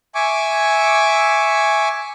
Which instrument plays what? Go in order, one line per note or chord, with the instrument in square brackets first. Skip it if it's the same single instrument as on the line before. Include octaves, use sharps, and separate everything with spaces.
[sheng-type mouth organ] E5 G#5 C#6 D6